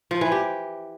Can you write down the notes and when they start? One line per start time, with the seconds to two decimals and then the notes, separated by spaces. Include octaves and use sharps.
0.11 F3
0.21 E3
0.32 G4